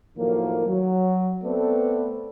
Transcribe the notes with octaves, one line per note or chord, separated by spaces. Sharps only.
A2 D#3 F3 F#3 A#3
F#3
A3 B3 C4 A4 B4 D5